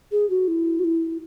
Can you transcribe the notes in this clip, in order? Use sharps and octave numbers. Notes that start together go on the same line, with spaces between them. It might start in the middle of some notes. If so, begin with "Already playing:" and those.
G#4
F#4
E4
F#4
E4